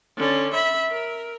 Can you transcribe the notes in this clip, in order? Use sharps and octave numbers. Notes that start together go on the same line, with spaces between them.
D3 C#4
E5 B5
A#4